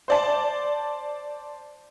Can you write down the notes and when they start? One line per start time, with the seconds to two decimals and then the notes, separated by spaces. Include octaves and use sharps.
0.08 C5 D5 A5